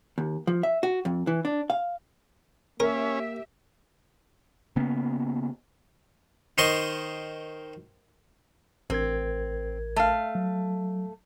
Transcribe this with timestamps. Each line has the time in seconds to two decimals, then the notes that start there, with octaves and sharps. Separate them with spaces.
0.18 D#2
0.47 F3
0.63 E5
0.83 F#4
1.05 F2
1.27 E3
1.45 D4
1.70 F5
2.80 A#3 C#4 G4 A#4 E5
4.76 C#3 A#3 B3 C#4
6.58 D#3 C5 D#5 C6 C#6
8.90 A1 C4 A#4 G#6
9.96 A3 F5
10.35 F#3